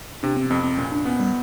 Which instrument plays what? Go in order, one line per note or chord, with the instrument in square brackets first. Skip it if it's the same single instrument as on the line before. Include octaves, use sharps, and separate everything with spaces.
[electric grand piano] C3 [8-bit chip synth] D4
[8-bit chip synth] C4
[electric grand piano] F2 [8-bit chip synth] C4
[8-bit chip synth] C4
[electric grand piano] A#2 [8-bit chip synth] C#4
[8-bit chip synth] D4
[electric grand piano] B3 [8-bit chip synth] C#4
[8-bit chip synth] G3